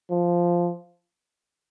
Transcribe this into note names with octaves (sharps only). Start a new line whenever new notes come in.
F3